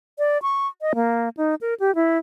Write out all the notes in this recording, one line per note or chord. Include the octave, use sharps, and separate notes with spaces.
D5
C#6
D#5
A#3
D#4
A#4
G4
E4